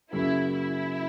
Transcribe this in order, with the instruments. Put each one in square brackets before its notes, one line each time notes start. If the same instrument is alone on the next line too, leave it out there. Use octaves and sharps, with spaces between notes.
[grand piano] F#2 C#3 F#3 A#3 [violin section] E4
[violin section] E4